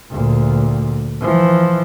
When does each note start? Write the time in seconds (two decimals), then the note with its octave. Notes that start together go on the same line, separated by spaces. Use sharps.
0.11 D2 A#2
1.21 E3 F3